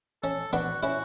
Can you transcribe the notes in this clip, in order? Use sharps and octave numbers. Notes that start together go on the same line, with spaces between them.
C#4 A4
B3 D4 F#4
C#4 E4 F#4